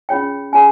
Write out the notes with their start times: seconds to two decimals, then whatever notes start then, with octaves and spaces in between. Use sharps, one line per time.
0.09 C#4 F4 G#4 C#5 G5
0.53 C#4 F4 G#4 C#5 G#5